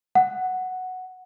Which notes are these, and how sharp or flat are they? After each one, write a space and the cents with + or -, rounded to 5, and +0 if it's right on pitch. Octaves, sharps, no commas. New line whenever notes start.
F#5 +0